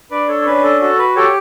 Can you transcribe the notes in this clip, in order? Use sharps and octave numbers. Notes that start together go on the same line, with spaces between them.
D4 B4 D5
A4 C#5
C#5
C#4 B4
A4
F#4 A4
B4
G4 A4 C#5